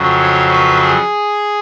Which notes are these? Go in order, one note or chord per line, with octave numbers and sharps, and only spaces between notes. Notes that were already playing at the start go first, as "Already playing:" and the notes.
Already playing: F2 C#3 F#3
C#5
B4
G#4